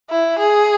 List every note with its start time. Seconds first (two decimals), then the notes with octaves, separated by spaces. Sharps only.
0.10 E4
0.39 G#4